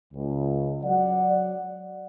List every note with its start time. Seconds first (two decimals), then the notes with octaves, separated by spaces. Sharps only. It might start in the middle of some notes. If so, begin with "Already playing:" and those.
0.14 C#2
0.83 F#3 D5 F#5